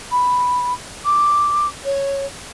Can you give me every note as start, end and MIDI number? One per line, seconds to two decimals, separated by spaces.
0.11 0.73 83
1.05 1.67 86
1.85 2.26 73